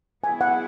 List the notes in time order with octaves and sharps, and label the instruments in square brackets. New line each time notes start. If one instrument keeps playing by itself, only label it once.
[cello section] F#3 B3 E4 G#4 [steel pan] G#5
[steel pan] F#5